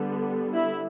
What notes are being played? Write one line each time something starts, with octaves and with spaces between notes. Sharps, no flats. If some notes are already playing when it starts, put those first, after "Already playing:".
Already playing: D3 G3 B3
E4